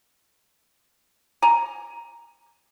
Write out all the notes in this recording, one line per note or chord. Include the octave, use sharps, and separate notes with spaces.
G#5 A#5